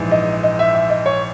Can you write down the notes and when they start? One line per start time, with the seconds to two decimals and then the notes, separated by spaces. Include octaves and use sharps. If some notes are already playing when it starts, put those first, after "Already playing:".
Already playing: A#1 G#2 E3
0.11 D#5
0.43 D#5
0.59 E5
0.75 E5
0.90 D#5
1.06 C#5